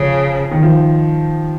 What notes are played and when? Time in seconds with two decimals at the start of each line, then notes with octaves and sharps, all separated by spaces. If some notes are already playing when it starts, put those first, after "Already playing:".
Already playing: C#3 F3
0.51 D#3
0.62 F3